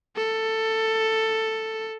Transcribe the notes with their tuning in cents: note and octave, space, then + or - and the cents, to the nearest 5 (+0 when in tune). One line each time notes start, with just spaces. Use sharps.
A4 +10